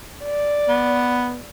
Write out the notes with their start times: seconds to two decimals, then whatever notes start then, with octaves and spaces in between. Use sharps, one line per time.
0.24 D5
0.68 B3